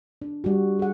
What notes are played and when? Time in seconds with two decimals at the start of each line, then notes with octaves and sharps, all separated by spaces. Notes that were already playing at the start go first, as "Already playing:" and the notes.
0.22 D4
0.44 G3 F#4
0.79 G#4 F#5